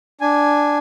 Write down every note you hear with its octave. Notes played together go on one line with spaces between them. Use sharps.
D4 G#5